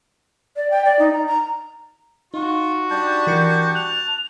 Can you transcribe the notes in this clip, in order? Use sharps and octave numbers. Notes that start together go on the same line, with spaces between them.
D5
G5
D5
D#4
A#5
A#5
D#4 F4 F#4 C#6
G3 D4 A5 G6
E3 A#4 C#7
A5 F#6 F7